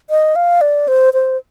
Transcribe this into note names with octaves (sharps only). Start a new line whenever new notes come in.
D#5
F5
D5
C5
C5